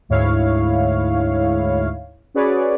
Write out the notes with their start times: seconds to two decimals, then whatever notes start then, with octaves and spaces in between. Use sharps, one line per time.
0.09 D2 G#2 E4 C#5 F5
2.34 C#4 F#4 G#4 B4 C#5 D5